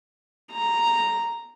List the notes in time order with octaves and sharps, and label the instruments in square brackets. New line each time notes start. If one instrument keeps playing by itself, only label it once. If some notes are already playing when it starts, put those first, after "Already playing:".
[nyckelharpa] A#5